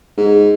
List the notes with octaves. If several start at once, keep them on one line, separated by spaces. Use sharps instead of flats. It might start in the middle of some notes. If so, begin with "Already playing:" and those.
G#2